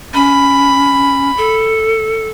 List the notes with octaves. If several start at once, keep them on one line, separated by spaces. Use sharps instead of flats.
C#4 B5
A4